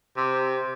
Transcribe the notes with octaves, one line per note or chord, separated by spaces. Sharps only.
C3